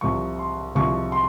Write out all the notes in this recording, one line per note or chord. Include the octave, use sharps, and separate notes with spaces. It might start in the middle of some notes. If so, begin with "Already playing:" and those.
C2 C3 F3 C#6
C6
C2 C3 F3 C#6
C6